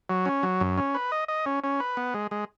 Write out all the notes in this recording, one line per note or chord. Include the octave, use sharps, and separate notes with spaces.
F#3
C#4
F#3
F#2
C#4
B4
D#5
D#5
C#4
C#4
B4
B3
G#3
G#3